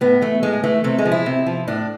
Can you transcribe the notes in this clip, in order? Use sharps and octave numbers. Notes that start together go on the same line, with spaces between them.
A2 B3
E3 A3
A2 G#3
E3 A3
C3 A3
G#3
F3
E4
C3
F3
A2 D4